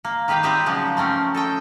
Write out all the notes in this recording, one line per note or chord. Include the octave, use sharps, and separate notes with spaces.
A#3
D#3 G4 B4 F5 G5
G3 C4 D#4 G4 B4 E5
C#3 F3 F#3 G#3 A#3
A3 C4 C#4 A#4
A4 D#5 G5